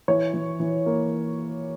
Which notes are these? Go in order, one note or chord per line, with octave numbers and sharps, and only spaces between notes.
E3 C#5
E3
E3
A#3